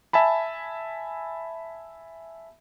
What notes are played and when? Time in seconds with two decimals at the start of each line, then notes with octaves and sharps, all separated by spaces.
0.13 E5 G#5 A5 B5